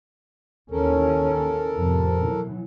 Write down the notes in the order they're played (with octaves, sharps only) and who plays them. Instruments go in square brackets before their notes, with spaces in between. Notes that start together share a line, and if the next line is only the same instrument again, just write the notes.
[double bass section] D#2 E3 C#4 [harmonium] A4 A#4
[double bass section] F2 A2 C3
B2 E3 F#3